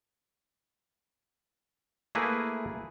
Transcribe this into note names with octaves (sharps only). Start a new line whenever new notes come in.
A3 A#3 E4 G#4 B4